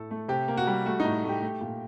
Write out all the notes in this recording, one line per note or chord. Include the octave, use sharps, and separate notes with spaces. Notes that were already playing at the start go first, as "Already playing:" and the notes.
Already playing: A2 A3 A4
A3
C3 G4
A#3
F#4
G3
A3 F#4
D#4
A2
A3 G4
A3
A#2